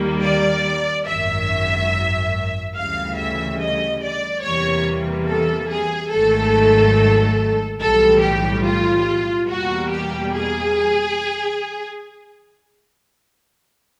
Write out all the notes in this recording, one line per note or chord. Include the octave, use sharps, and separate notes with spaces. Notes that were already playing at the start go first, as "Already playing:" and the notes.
Already playing: D#2 D#3 G3 A#3
D5
G#1 F#2 D#3 F#3 E5
D2 C#3 E3 G3 F5
E5
D#5
D5
E2 C3 E3 G3 A#3 C#5
A4
G#4
G#1 G#2 D#3 F#3 A3 A4
B1 A2 E3 G3 A4
G4
F4
E2 B2 G3 A#3 F#4
G4
G#4